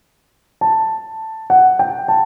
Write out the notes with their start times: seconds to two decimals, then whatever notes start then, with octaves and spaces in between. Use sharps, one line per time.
0.61 A5
1.50 F#5
1.79 G5
2.08 A5